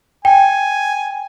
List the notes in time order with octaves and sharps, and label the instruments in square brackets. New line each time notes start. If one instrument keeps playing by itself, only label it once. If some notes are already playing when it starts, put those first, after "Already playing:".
[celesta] G5 [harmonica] G#5